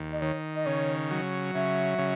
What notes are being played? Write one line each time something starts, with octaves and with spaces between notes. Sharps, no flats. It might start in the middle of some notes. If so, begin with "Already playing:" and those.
Already playing: D#2
D#5
D#3 C#5
D#5
C#3 C#5
F#3
C#3 E5
C#3